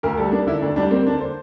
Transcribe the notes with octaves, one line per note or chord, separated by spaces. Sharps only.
D2 A#4
G3 A4
A#3 D4
D3 E4
D2 D4
G3 D4
A#3 C4
D3 D4
C5